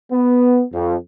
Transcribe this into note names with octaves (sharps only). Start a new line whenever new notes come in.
B3
F2